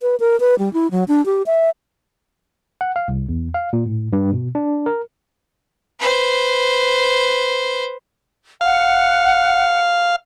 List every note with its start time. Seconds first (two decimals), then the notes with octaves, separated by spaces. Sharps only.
0.02 B4
0.20 A#4
0.40 B4
0.59 G3
0.73 E4
0.91 F#3
1.08 D4
1.26 G4
1.46 E5
2.81 F#5
2.96 F5
3.08 C2
3.29 E2
3.54 F5
3.73 A#2
3.86 A2
4.13 G2
4.33 B2
4.55 D4
4.86 A#4
5.99 B4 C5
8.61 F5 F#5